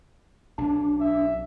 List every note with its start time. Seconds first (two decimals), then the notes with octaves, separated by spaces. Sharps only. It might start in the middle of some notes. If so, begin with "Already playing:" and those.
0.58 B1 C#4 D4
1.01 E5